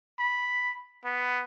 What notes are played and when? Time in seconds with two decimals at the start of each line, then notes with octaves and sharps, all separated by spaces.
0.19 B5
1.05 B3